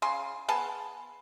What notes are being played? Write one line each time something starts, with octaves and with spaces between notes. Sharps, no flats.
C#3 G#4 C6
B3 G#4 A5